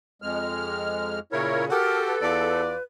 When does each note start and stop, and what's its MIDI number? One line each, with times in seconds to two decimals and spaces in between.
0.22 1.19 41
0.22 1.19 56
0.22 1.19 89
1.32 1.66 46
1.32 1.66 49
1.32 1.65 64
1.32 1.65 70
1.32 1.65 73
1.70 2.15 66
1.70 2.15 67
1.70 2.61 69
1.70 2.05 70
2.07 2.83 71
2.21 2.73 40
2.21 2.73 65
2.21 2.73 74